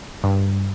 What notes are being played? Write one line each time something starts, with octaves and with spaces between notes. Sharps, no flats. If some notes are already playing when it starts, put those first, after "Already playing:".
G2